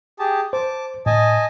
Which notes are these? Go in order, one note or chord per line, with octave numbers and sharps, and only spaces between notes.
G4 G#4 A5
C5 A5 D6
A2 D#5 G#5 A5